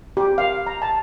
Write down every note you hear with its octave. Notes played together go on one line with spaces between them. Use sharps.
G4
F5
A#5
A5